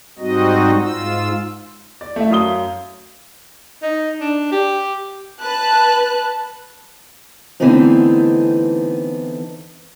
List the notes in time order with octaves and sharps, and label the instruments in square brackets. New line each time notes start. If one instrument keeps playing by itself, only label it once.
[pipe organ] G#2 G3 C4 D#4 F#4 D#5
G#2 F4 E6
[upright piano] D5
A3 E5
F#2 F5 D#6 G7
[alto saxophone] D#4
D4
G4
[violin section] B4 A5 F#6
[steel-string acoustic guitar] D3 E3 A3 B3 C4 D#4